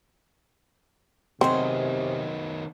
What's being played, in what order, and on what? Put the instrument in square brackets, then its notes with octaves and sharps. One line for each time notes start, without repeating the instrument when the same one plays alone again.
[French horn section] C3 [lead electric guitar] D#3 B3 [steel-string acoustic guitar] F#3 G#4 D#5 [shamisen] C4